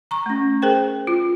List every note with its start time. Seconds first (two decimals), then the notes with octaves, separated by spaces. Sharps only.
0.11 A#5 C#6
0.26 A3 C#4
0.62 G#4 A#4 C5 G5
1.07 F4